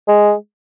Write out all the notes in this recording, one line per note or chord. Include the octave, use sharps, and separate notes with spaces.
G#3